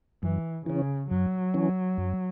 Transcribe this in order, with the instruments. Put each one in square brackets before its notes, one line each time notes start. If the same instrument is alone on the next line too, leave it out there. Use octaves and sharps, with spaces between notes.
[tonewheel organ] F#2 [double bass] E3
[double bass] C#3 [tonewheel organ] E3 C#4
[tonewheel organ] F#2 [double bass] F#3
[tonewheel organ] E3 C#4
F#2